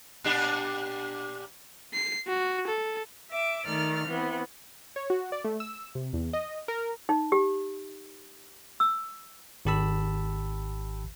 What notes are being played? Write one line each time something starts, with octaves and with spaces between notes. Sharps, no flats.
A#2 D4 G4
C7
F#4
A4
E5 D6
D#3 A3 D5 F6
E3 B3 C4
C#5
F#4
D5
A3
E6
C3
E2
D#5
A#4
D#4
G4
E6
G#1 D#3 G4 A5 B5 E6